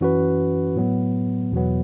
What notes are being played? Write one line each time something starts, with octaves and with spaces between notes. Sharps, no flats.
F#2 E3 C#4 F#4 B4
A2 F#3 B3
E2 B2 F#3 B3